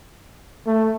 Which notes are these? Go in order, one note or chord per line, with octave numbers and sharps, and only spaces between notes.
A3